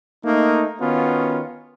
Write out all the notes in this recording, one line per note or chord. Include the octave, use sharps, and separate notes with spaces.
A3 A#3 D#4
D#3 B3 C#4 F4 F#4